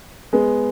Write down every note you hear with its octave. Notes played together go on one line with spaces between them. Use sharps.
G#3 B3